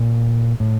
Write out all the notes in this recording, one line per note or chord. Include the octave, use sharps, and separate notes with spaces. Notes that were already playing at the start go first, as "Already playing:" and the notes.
Already playing: A#2
A2